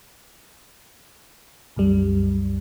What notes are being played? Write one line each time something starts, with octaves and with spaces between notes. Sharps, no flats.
C2 F#2 G3